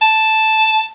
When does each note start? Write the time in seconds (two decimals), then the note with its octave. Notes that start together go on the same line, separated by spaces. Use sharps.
0.02 A5